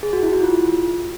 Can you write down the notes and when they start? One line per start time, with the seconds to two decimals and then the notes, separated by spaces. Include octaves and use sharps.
0.03 G#4
0.13 F#4
0.23 E4
0.33 F#4
0.43 F4